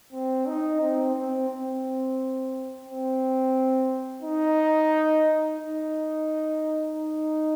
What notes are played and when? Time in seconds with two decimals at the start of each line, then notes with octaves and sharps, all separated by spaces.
0.13 C4
0.47 D#4
0.81 C4
1.15 C4
1.50 C4
2.85 C4
4.22 D#4
5.59 D#4
6.95 D#4